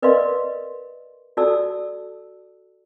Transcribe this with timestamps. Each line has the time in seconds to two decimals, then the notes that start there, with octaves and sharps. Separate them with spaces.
0.02 A#4 B4 D5 D#5 F5 C6
1.37 F#4 A4 D5 A5 E6